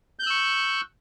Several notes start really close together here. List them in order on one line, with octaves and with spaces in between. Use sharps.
G6 F#6 E6 C#6